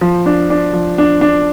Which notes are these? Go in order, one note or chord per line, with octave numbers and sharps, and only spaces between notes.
F3
D4
D4
F3
D4
D4